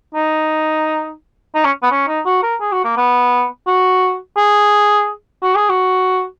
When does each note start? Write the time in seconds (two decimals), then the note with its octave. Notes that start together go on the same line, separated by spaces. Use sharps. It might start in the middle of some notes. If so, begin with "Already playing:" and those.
0.15 D#4
1.55 D#4
1.65 C#4
1.83 B3
1.91 C#4
2.08 D#4
2.26 F#4
2.43 A#4
2.60 G#4
2.72 F#4
2.84 A#3
2.97 B3
3.67 F#4
4.37 G#4
5.42 F#4
5.55 G#4
5.69 F#4